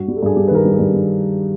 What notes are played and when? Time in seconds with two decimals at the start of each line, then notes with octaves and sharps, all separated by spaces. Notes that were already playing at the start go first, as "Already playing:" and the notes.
Already playing: G2 F#4
0.08 G3
0.16 A4
0.22 G2 G#4
0.36 G3 G4
0.48 B4
0.51 D#3 A#4
0.65 G3
0.74 G#4
0.79 G2
0.93 G3